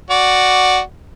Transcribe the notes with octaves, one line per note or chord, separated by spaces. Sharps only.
F#4 D5